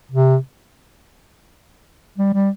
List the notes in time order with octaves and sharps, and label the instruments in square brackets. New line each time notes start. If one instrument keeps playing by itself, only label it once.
[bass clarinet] C3
G3
G3